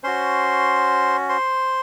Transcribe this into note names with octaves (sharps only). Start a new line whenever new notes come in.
C#4 F#4 C5 C6
C5 C6